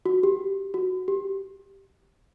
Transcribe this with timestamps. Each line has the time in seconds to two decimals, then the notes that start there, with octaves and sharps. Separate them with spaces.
0.06 F#4
0.23 G4
0.74 F#4
1.08 G4